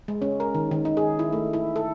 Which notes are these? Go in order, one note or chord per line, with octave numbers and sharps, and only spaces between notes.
G#3
C#4
A#4
D#3
D#3
D#4
G#4
E4
A3
E4
A4